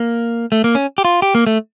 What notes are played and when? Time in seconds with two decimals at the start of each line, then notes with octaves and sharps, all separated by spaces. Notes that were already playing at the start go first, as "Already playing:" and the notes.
Already playing: A#3
0.52 A3
0.64 A#3
0.75 C#4
0.98 G4
1.05 F4
1.22 G4
1.35 A#3
1.47 A3